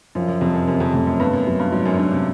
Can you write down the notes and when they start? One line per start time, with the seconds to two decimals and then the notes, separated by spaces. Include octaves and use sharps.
0.15 F#2 F3
0.28 F#2
0.41 F2 C3
0.54 F#2
0.67 F#2 C3
0.80 F2
0.94 F2 A3
1.07 F#2
1.20 G2 B3
1.33 F#2
1.46 F#2 F#3
1.59 G2
1.72 G#2 F#3
1.86 F#2
1.99 F#2 D4
2.11 C3